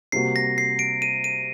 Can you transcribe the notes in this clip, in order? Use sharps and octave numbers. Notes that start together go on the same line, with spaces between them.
C3 G3 A#3 F#4 C7
A#6
C7
D7
D#7
D#7